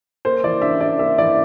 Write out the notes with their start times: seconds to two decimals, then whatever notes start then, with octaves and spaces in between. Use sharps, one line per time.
0.25 A#3 C5
0.43 E3 D5
0.62 D4 E5
0.81 D4 D5
0.99 A#3 E5
1.18 E3 D5